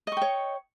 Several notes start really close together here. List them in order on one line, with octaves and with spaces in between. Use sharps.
D#5 C#6 G5 C#5